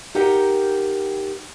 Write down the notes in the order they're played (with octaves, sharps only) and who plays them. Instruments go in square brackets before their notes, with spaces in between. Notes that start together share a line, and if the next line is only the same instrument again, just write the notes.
[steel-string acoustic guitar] D#4 G4 A#4 F#5 G5